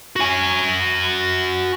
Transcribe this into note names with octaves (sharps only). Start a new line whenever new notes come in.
F#4 G#5